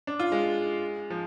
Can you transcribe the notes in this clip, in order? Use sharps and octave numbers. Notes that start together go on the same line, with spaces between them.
D4
F4
G#3
F3